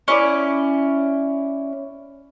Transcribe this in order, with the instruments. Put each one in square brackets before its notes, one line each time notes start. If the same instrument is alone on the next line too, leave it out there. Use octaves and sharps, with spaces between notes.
[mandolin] C#4 E4 D5